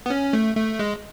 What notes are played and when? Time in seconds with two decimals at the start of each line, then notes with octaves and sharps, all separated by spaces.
0.06 B3
0.10 C#4
0.33 A3
0.56 A3
0.79 G#3